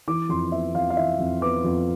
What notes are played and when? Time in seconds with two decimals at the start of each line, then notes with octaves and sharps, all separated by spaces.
0.08 E3 D6
0.29 F2 C6
0.52 B3 E5
0.75 F2 F5
0.90 F5
0.97 E3 E5
1.19 F2
1.41 B3 D6
1.64 F2